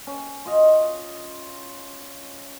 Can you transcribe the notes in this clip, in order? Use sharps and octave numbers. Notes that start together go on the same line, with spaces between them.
C#4
F4 D#5